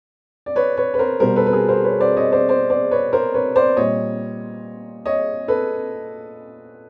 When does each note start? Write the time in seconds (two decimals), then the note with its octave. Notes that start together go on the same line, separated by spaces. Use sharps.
0.46 D5
0.56 B4 C#5
0.77 B4 C#5
0.94 B4
0.99 A#4 C5
1.20 B2 G3 A#4 C5
1.36 A4 B4
1.46 B4
1.53 G#4 A#4
1.68 A#4 C5
1.84 B4 C#5
2.00 C5 D5
2.17 C#5 D#5
2.32 C5 D5
2.49 C5 D5
2.70 C5 D5
2.91 B4 C#5
3.13 A#4 C5
3.34 B4 C#5
3.56 C5 D5
3.77 A#2 G3 C#5 D#5
5.06 C#5 D#5
5.48 A4 B4